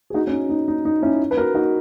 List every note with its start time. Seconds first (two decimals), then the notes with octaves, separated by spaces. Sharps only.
0.10 G#4
0.14 D#4 F#4
0.27 C#4
0.32 D#4
0.49 D#4
0.68 D#4
0.85 D#4
1.02 C#4 E4
1.31 B4
1.37 F#4 A#4
1.54 D#4 F#4